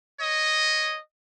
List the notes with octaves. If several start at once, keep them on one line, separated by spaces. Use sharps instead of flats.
C#5 D#5